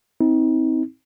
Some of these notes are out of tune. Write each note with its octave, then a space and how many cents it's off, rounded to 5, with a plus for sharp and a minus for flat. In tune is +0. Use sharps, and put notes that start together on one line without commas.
C4 +0 D#4 +35